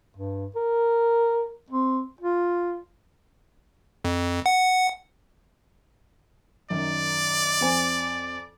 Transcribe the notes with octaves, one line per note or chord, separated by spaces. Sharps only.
G2
A#4
C4
F4
F2
F#5
F#2 D#3 D5
F2 C5 G#5